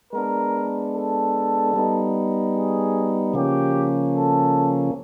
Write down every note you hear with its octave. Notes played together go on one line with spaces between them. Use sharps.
G#3 B3 D4 A#4
A4
G3 B3 D#4
G#4
C#3 F3 A#3 C#4 G4
A4